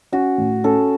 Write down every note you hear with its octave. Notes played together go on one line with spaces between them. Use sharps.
C#4 F#4
A2
C#4 A4